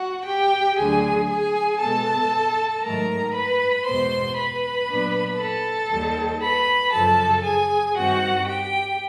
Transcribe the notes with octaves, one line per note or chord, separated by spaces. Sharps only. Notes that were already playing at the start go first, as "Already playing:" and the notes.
Already playing: F#4 F#5
G4 G5
D2 D3 F#3 A3 D4 G#4 G#5
G#4 G#5
B2 G#3 B3 A4 A5
G#2 D#3 F#3 A3 A#4 A#5
B4 B5
E2 B2 G#3 B3 C5 C6
B4 B5
A#2 F#3 B3 D4
A4 A5
D#2 D#3 G3
B4 B5
F#2 C#3 F3 A4 A5
G#4 G#5
G2 D#3 G3 C4 F#4 F#5
G4 G5